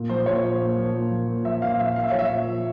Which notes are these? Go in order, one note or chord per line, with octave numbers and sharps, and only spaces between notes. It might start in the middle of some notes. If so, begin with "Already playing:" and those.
Already playing: A#2
F3 C5
A#2 C#5
F3
A#2
F3
A#2
F3
A#2
F3 E5
A#2 F5
F3 E5
A#2 F5
E5
F3 C#5
E5
A#2
F3